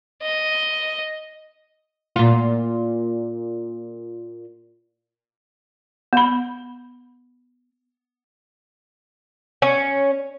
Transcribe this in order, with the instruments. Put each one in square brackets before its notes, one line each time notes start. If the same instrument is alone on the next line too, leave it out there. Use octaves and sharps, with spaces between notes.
[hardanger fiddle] D#5
[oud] A#2 F4
[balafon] B3 B5
[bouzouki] C#4